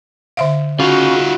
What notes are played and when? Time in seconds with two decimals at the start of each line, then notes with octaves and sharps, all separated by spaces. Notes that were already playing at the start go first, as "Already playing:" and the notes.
0.37 D3 E5 F5
0.80 C#3 D#4 F4 F#4